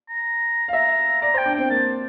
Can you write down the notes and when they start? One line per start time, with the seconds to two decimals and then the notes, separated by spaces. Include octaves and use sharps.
0.09 A#5
0.68 F5
0.73 E5 A#5
1.21 D5 A#5
1.34 C5
1.38 G5
1.46 D4
1.55 C4 G5
1.70 A#3 A5